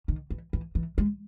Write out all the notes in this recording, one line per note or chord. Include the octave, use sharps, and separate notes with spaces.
D#3
E3
E3
E3
G#3